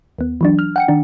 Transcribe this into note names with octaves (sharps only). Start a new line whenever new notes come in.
D#2 B3
E3 F#3 D4
F6
F#5 G5 C#7
D#3 D4